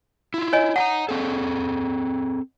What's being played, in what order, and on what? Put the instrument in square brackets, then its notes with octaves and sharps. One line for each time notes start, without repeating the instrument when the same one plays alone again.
[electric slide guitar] E4 F4
[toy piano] C#5 D#5 G#5
[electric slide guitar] D#5 A5 A#5 [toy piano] F#5
[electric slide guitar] C4 G#4 A4